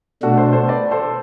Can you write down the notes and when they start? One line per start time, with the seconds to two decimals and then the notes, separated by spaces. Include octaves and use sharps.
0.22 B2 A3 D4 F#4 A4
0.38 A4 C5
0.53 A4 C5
0.68 B4 D5
0.91 A4 C5